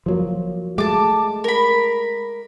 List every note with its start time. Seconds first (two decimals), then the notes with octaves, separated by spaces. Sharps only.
0.06 F3 F#3 A#3
0.78 G#3 A3 A5 D6
1.44 A#4 B5